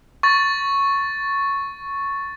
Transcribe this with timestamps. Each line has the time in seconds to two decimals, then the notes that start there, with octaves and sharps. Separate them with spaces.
0.23 C#6 A6